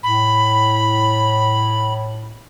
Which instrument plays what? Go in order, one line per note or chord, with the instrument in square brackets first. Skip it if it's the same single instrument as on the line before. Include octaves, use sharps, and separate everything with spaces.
[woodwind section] A2 [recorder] B5